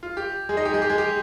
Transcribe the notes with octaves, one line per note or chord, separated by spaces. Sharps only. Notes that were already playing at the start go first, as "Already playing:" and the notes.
F4
G4
G#3 G#4
D#4 D#5
G4
G#3 G#4
G4
G#3 G#4
G4